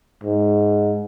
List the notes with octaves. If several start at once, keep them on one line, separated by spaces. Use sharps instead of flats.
G#2